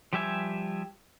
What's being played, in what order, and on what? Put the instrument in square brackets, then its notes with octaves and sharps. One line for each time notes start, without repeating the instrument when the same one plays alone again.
[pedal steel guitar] F3 G3 G4 E5 G#5